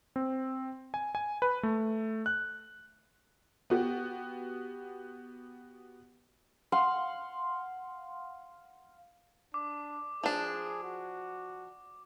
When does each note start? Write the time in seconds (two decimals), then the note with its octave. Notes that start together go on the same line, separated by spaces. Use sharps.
0.16 C4
0.94 G#5
1.15 G#5
1.42 B4
1.63 A3
2.26 F#6
3.70 B3 F#4 G4
6.72 F5 F#5 C6
9.54 D4 D6
10.24 F3 D4 G#4
10.84 F#4